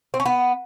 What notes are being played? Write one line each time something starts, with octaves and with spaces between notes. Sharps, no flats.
C4
C#4
B3